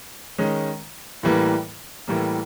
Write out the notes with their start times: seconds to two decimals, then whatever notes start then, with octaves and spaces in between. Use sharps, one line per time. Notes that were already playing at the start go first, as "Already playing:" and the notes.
0.38 D#3 G#3 C#4
1.23 A2 E3 G3 A#3
2.08 A2 E3 G3 A#3